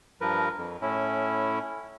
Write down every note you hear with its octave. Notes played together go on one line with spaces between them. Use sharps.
G2 F3 A#4 B4
F2
A2 C#4 E4